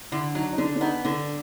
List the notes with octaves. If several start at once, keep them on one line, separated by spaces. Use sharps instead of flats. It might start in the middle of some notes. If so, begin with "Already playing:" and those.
D3 E4
F#3 D#4
D#4
D3 D4
D4
B3 D#4
D3 D4